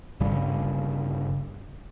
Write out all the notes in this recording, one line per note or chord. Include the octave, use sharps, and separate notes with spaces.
G1 G2 C#3 G3